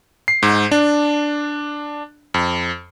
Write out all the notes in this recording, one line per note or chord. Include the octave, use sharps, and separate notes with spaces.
C7
G#2
D4
F2